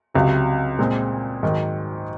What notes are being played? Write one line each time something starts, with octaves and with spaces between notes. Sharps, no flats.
C#2 C3 F#3
A#2 G#3 C4
G#2 D#3 F#3